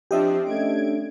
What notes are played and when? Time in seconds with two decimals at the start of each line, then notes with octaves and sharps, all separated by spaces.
0.11 F3 C4 D4 G4 D#5 E5
0.45 A3 C#4 D4 G#6 D7